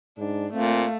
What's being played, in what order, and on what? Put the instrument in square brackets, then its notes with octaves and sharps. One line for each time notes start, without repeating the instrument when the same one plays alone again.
[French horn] G#2 [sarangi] D4
[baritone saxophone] A#2 [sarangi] A3 [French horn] C4 [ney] F5